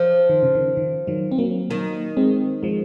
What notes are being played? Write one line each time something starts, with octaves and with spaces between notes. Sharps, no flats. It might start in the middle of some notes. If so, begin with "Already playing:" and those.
Already playing: F3
D#3
C#3
D#3
D#3
D#3 F#3
C4
F#3 A#3
D#3 F#3 A#3
G#3 C4
F3 G#3